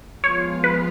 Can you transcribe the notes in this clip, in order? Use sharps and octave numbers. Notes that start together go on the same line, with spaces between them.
F3 G#3 B3 F4 C#5
B4